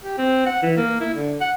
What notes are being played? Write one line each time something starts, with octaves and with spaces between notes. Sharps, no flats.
G4
C4
F#5
E3
A#3
E4
D3
F#5